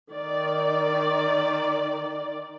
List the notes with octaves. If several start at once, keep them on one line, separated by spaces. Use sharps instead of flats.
D#3 D5